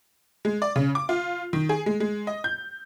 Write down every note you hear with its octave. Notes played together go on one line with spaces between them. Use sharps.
G#3
D5
C#3
D6
F4
D#3
G#4
G#3
G#3
D#5
G6